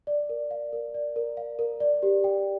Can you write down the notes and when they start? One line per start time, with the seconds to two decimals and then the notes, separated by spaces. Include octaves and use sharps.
0.07 D5
0.29 A#4
0.51 F5
0.73 A#4
0.94 D5
1.16 A#4
1.37 F5
1.59 A#4
1.80 D5
2.03 G4
2.24 G5